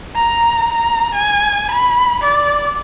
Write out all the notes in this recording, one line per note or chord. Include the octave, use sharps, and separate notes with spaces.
A#5
A#5
G#5
B5
D5